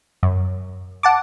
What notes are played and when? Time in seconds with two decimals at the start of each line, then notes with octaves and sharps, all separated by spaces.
0.23 F#2
1.03 F#5 A5 D6